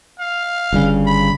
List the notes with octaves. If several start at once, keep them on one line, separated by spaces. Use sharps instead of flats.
F5
G1 G2 C#3
B5